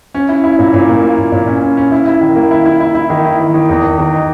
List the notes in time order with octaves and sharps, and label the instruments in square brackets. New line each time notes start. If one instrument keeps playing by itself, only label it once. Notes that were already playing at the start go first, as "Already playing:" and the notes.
[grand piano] C#4
E4
E4
A#2
A#2
A#3
A#3
A#2
A#2
C#4
C#4
C#4
E4
E4
D#3
A#3
E4
E4
E4
E4
D#3
E4
D#3
D#3
E2
D#3
D#3
D#4